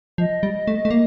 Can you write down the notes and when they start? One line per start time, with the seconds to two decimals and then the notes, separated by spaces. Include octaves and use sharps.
0.18 F3 D#5
0.43 G3
0.68 A3
0.85 A3
0.91 A#3